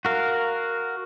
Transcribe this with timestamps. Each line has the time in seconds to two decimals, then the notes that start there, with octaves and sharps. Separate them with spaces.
0.05 F#4 A#4 F5